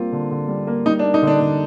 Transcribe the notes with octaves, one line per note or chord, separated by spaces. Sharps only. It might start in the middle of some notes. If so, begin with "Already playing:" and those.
Already playing: G3 A#3 C4 F4
D3
D3
G3
A#3
G3 D#4
D4
A#3
D#4
D3
D4
D3